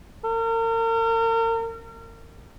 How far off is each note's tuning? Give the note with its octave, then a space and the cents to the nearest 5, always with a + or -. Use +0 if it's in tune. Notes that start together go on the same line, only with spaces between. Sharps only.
A#4 -40